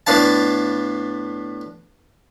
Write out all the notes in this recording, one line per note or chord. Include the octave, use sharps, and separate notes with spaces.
A2 B3 D4 F5 A5